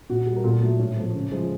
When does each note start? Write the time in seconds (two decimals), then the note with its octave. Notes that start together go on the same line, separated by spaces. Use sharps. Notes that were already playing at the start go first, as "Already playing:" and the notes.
0.10 A#2 F#4
0.27 G3
0.36 A#4
0.44 A#2 A4
0.61 F#3 A3
0.79 A2
0.97 F3 A3
1.15 C#3
1.32 F3 G#3